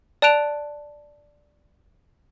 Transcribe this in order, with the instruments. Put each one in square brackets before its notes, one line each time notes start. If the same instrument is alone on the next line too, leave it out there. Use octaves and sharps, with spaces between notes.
[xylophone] D5 A5 F#6 D7 F7